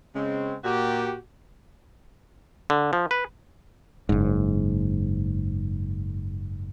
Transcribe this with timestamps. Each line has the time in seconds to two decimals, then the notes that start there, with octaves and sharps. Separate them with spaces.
0.15 C#3 G#3 C4
0.64 A#2 F#4 G4
2.70 D3
2.93 F3
3.11 B4
4.09 F#1 G#2